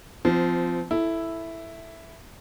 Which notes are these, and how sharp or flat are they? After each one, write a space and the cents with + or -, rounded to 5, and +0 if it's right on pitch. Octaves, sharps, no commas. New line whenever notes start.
F3 -10 C4 -25
E4 +0 A4 -5